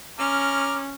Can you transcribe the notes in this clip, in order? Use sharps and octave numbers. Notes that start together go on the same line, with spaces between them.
C#4 A#5 D6 F6